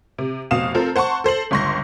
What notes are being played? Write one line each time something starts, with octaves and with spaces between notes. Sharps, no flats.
C3
F1 B2 F5 D#6 E7
C4 F4 A4 A#4
C5 F#5 A5 C6 C#6
A4 C5 C7 F#7
G1 C#2 C6 C#6 A#6